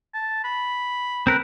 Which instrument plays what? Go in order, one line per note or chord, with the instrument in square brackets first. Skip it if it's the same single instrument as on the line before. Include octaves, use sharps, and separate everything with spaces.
[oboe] A5
B5
[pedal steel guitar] C4 A#4 B4